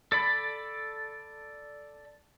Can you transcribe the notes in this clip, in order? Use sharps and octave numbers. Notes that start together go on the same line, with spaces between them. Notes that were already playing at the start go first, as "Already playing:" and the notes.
A4 D5 B5